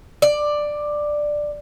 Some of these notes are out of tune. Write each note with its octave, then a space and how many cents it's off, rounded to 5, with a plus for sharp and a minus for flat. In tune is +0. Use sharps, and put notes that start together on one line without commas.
D5 +10